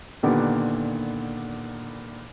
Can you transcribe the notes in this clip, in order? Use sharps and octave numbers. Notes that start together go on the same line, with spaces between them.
A#2 D3 D#3 B3 G4